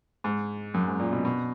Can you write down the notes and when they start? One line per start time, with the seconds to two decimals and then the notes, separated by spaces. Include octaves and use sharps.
0.24 G#2
0.74 F#2
0.87 G#2
1.00 A#2
1.12 B2
1.25 B2